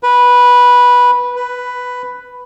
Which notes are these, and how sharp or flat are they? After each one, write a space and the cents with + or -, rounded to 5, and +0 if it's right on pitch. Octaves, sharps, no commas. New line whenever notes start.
B4 -10
B4 +5